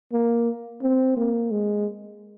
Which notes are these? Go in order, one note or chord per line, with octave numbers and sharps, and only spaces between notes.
A#3
C4
A#3
G#3